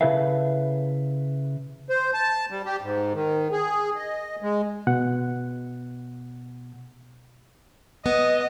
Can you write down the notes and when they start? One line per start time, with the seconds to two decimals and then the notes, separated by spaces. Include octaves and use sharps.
0.01 C#3 E4 A4 B4 E5 F5
1.88 C5
2.14 A5
2.50 G3
2.66 G4
2.82 G#2
3.14 D#3
3.52 G#4
3.96 D#5
4.42 G#3
4.87 B2 F#5
8.06 B3 D#5